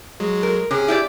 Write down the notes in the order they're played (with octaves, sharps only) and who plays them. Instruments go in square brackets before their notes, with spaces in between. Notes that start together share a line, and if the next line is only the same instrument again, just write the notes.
[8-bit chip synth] F#3 G#3
[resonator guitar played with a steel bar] A#4
[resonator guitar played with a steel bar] C3 [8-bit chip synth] C#4 G#4
[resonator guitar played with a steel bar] E4 G4 D5